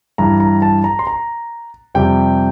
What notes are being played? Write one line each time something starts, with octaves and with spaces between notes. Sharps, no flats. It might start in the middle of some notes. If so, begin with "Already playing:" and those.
G2 E3 G3 A#5
A#5
A5
A#5
C6
A#5
F2 C3 G3 G5